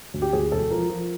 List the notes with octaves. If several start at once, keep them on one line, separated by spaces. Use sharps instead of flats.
D2
G4
D2 G#4
E1 A4
F3 A#4
F3